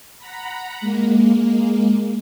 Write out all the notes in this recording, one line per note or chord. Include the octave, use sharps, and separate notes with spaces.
F#5 A#5 B5
G#3 A#3